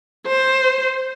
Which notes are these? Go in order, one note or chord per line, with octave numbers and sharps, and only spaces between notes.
C5